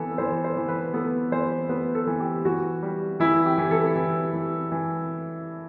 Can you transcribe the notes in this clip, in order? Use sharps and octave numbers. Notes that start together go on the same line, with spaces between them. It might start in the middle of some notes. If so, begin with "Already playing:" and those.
Already playing: E3 B3 A4
E3 C5
C5
E3
B4
B3 A4
E3 C5
B3 B4
A4
E3
G4
E3 F#4
G3
E3 E4
G4
E3
A4
E3
E3
E3